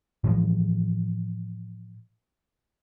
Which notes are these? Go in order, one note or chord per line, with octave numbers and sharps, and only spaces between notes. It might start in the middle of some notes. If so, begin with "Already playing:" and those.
A2 E3 F3 G#3